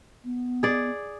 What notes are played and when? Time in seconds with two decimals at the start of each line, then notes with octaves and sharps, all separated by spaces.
0.24 B3
0.63 G#4 D5